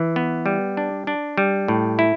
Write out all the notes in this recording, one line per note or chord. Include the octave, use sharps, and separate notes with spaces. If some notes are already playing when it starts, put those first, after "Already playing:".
Already playing: E3
B3
G3
D4
D4
G3
A2
E4